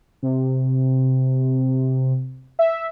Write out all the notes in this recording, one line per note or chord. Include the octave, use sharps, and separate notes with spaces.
C3
E5